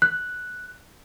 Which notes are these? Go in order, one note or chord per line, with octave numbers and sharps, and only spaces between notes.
F#6